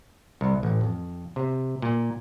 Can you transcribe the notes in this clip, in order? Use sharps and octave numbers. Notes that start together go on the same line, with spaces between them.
C2
A1
F2
C3
A#2